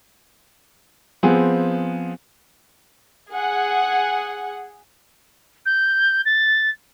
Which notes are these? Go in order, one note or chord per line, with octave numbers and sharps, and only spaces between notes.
F3 B3 C4 G#4
G#4 F#5
G6
A6